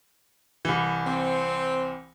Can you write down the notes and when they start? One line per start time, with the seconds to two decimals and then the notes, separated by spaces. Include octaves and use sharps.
0.65 C2 E3
1.06 C4